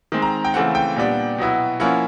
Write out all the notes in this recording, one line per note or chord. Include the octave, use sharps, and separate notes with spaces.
D#3 G#3 C4
A#5
G5
C#3 E3 A3 C4 F#5
G5
A#2 G3 B3 D4
B2 F#3 B3 E4
F3 A#3 C#4 E4 F#5